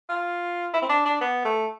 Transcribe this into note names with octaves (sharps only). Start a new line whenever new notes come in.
F4
E4
C4
D4
D4
B3
A3